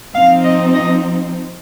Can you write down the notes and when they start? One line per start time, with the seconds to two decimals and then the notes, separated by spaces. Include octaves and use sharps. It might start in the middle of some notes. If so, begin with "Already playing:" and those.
0.14 F3 C4 D#4 F5
0.44 D#5
0.74 D#5